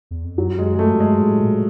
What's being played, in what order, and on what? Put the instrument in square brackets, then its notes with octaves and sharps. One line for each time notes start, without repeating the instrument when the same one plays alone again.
[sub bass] E2
F2
[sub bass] F#2 [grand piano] F#3
[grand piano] G#3
G#3
A3
[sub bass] G#2
[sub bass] G2 [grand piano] G#3
[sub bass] A2
A#2